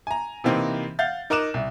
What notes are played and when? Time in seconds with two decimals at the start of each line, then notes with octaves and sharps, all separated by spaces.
0.07 G#5 A#5
0.44 C3 E3 A#3 C4 D#4 A#4
0.99 F5 F#5 G6 A6
1.30 D#4 A#4 A#5 D6 F#6 E7
1.54 C2